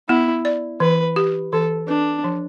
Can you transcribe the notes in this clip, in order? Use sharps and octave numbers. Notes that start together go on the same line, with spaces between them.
B3 E4
D5
E3 B4
G4
E3 A4
D4 B4
F3